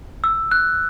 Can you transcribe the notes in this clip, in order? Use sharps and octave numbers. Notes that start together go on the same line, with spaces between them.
E6
F#6